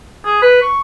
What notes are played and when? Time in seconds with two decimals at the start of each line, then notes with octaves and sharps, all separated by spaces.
0.25 G#4
0.42 B4
0.62 C#6